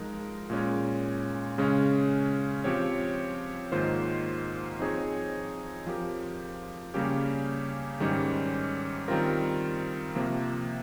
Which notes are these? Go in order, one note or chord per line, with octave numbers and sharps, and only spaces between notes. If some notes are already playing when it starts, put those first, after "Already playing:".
Already playing: F3 G#3 D#4 A#4
A#2 G#3 C#4
C#3 G#3 C#4
F3 C4 G4 C#5
G#2 D#3 A#3 F4 C5
F3 C4 D#4 G#4 C#5
F3 C4 G4 A#4
C#3 G3 A#3 C#4 G4
G#2 D#3 G3 C#4 G4
D#3 G3 C4 F4 A#4
C3 F3 A#3